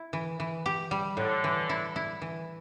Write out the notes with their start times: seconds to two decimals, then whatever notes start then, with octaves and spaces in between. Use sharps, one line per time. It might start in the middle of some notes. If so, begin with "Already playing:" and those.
Already playing: E4
0.13 E3
0.40 E3
0.66 G4
0.91 G3
1.17 A2 D3
1.44 E3
1.69 E4
1.96 E4
2.22 E3